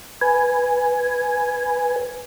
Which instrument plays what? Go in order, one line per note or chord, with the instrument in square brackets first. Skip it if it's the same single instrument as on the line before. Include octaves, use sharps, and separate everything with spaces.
[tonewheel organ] B4 G#5